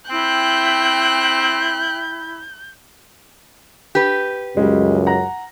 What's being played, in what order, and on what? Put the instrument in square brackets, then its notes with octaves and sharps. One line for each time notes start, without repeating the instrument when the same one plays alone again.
[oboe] C4 [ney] E4 [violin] G5 F#6 [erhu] G6
[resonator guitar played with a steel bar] G4 B4
[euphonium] C#2 [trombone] F#2 [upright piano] G3 G#3
[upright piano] F#5 A#5 A#6